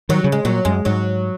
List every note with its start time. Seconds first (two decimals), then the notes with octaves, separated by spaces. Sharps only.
0.09 D#3 F#3
0.24 C#3
0.32 G#3
0.45 A#2 F#3
0.65 F#2 G#3
0.85 G#2 F#3